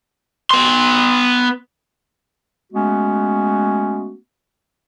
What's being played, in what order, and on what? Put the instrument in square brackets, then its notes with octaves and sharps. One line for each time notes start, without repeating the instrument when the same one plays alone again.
[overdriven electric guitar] B3 C6
[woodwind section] G#3 A3 B3 C#4 F#4